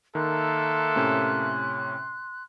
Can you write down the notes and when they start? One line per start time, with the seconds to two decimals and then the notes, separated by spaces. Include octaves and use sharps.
0.15 D#3 A#3 A4 E5 C6 F#6
0.96 A2 C3 C#4